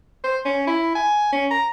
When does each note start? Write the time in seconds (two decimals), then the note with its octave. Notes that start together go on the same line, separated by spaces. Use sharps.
0.24 C5
0.45 C#4
0.67 E4
0.95 G#5
1.33 C#4
1.51 A#5